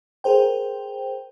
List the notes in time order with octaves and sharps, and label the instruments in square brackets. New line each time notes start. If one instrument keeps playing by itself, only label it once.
[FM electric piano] G#4 A#4 C5 G5